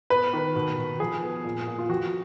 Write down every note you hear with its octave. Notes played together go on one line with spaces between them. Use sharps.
B3 B4
D#3
B2
B2
F3 G#4
B3
A#2
A#2
F4
F2 F#4